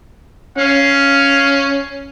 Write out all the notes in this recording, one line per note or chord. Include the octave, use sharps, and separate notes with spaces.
C#4 F5